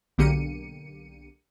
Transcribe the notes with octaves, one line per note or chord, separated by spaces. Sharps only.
B1 D3 A#3 G4 C#7 D#7